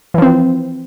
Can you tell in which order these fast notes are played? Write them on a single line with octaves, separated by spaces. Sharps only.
E3 F3 C4